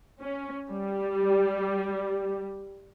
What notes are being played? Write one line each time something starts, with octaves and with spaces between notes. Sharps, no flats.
C#4
G3